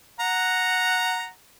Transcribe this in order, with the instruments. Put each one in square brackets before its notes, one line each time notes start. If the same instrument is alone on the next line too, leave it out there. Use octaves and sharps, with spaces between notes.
[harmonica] F#5 A#5